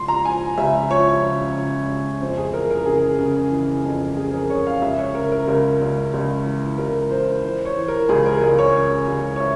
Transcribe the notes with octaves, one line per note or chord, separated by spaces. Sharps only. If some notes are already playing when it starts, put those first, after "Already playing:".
Already playing: C#2 F3 C6
A#5
F3 G#5
C#2 E5
F3 C#5
C#3
C#3
C#2
F2 C5
G#4
E3 A#4
A#4
C#3 G#4
C#3
E3
F2
F2 G#4
A#4
C#3 C#5
F5
C#2 E5
C#5
C#3 A#4
A#4
C#2 A#4
C#2
C#2
E3
C#2 A#4
A#4
E3 C5
E3 C5
C#5
E3
A#4
C#2 G#4
A#4
C#2
C#5
C#3
C#2
C#5
E3 E5